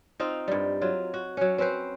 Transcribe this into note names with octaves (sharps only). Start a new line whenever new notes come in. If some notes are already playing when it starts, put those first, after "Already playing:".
C4 D#4 F4
G2 G3
F#3 F4
F#4
F#3 C#4
C4 C#4 B4 C5